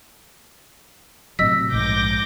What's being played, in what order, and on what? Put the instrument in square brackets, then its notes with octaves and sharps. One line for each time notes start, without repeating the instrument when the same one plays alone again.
[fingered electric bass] A2 C3 F#3 [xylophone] D#5 E6 B6
[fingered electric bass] A#1 G#2 [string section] D6 G6 A#6